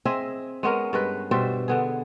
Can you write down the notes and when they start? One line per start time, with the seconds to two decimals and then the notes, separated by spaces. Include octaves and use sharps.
0.05 C4 G#4 D#5 E5
0.63 G#3 B3 C#4 A#4
0.93 G2 G#3 B4
1.31 B2 G3 C5 E5
1.68 D3 B3 G#4